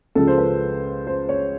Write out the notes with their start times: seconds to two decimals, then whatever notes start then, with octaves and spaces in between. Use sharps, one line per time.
0.15 C#2 C#3 F3 A4
0.27 C5
0.38 B4
1.07 C5
1.29 C#5